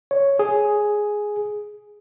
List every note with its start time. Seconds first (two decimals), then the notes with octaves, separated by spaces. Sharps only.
0.11 C#5
0.39 G#4